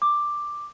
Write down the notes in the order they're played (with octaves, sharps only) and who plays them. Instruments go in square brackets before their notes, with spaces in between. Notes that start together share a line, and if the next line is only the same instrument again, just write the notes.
[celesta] D6